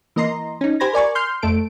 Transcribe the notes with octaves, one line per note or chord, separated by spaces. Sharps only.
E3 A#3 D#5 A#5 C6
C#4 D#4
G4 C5 G#5 B5 G#6 A#6
A#4 D5 G#5 C#6
C6 F6 G6 C7
F2 A3 A4 D7